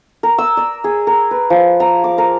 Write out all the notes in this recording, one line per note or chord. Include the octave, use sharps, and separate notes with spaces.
A#4
E6
D5
G#4
A#4
B4
F3
A#5
D6
A#4